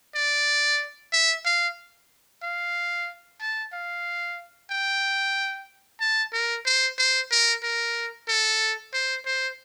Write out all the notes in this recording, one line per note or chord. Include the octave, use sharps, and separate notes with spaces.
D5
E5
F5
F5
A5
F5
G5
A5
A#4
C5
C5
A#4
A#4
A4
C5
C5